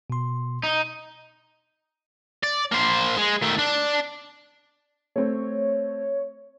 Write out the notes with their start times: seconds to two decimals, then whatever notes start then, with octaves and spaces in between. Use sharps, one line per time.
0.10 B2 C6
0.63 D#4
2.43 D5
2.72 A#3 C5
3.17 G#3
3.42 D#3 A3
3.59 D4
5.16 A3 C4 C#5